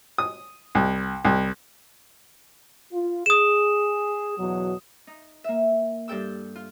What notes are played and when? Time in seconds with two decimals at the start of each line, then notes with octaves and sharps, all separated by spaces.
0.18 D#6
0.75 C2
1.25 C2
2.92 F4
3.26 G#4 D#6 E7
4.38 E2 B2 F#3
5.07 D#4
5.44 A#3 E5
6.08 G2 A4 G5 E6
6.55 F4